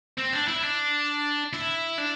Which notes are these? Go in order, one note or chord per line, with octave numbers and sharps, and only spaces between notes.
C4
D4
E4
D4
E4
D4